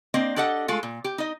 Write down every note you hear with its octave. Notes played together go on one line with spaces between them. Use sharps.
A#3 C4 D4 D#5
D4 G4 A4 D#5 F#5
G#3 A3 F4 A4
A#2
G4
D#4 D#5